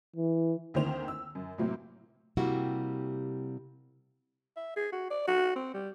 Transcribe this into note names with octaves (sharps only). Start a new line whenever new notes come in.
E3
D2 D#3 A#3 C4 C5 F7
E6
F#2
A2 C3 F#3 A#3 C4
C3 G3 A#3 E4 F#4
E5
G#4
F#4
D5
F#4
C4
G3